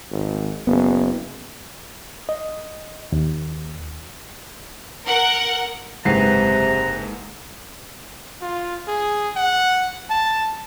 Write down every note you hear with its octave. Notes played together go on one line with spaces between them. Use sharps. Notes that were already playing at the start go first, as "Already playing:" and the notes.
G#1
F#1 B3
D#5
D#2
A#4 F#5
F#1 G#2 C3 B4 A#5 C7
F4
G#4
F#5
A5